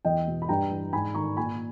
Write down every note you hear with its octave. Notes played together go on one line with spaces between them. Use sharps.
E2 D#5 G5
B2
B5
G2 G5 A#5
E3
G#2 G#5 B5
D#3 A#5 C#6
A#2 G#5 B5